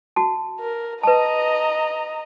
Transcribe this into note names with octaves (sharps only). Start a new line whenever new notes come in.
F#4 A5
A#4
B4 D#5 A5 A#5